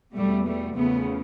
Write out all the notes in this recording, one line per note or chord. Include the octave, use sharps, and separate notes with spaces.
E2 B2 G3 A3
G3 A3
E2 C#3 F3 A3 B3